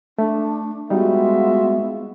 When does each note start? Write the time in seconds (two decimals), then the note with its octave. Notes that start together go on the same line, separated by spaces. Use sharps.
0.19 A3 D4
0.90 G3 G#3 B3 D#4 F4 F#4 E5